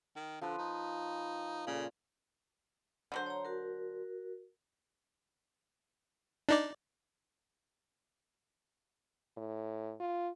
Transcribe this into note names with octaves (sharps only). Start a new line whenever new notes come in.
D#3
D3 F3 B4
D#4
A#2 C#3
D3 F#3 C5
C#5 A#5
F#4 A#4
D4 D#4 D5
A2
F4